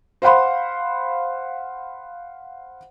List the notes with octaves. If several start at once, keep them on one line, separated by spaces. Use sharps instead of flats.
C5 F5 F#5 B5 C6